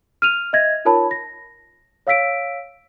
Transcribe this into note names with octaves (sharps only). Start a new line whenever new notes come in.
F6 D#7 F7
D#5 E5 G#6 A#6
D#4 F4 A#4 C#5 A5 B5
A#6
C#5 F5 E6 B6 D7